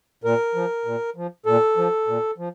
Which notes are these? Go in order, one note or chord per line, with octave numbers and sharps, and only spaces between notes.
A#2 A#4
F3
A#2
F3
A#2 A4
F3
A#2
F3